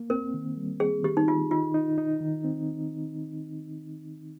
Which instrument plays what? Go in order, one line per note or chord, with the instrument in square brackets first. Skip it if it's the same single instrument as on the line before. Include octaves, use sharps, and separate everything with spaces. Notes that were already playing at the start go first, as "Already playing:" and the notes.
Already playing: [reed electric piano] A#3
[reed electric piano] C4 [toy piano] A#4
[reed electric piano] D#3
G3
[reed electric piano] C4 [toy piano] G#4
[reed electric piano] D#3 [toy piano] G4
[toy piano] D#4
[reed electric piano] D#3 [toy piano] F4
[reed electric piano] D#4 [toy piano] F4
[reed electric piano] D#4
D#4
D#3
C4